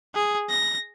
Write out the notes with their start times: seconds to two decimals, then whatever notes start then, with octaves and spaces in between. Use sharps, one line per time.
0.15 G#4
0.50 A#6